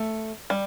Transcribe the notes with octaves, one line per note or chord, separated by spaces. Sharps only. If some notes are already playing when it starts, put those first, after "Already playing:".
Already playing: A3
G3